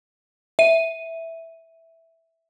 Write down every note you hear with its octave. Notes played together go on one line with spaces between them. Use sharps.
E5 D#7